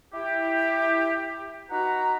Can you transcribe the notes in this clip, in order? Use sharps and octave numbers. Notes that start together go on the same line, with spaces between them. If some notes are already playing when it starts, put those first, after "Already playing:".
E4 G4
D#4 F#4 B4 F#5 A#5